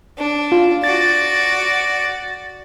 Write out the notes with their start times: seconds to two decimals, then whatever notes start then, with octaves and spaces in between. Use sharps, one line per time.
0.18 D4
0.52 F4
0.84 F#4 D5 A6